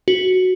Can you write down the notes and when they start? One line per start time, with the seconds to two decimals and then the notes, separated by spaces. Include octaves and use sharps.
0.08 F#4